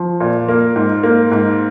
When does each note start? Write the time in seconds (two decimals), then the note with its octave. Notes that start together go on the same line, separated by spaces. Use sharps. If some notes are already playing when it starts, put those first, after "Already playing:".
Already playing: F3
0.20 A#2
0.48 A#3
0.76 G#2
1.03 A#3
1.31 G#2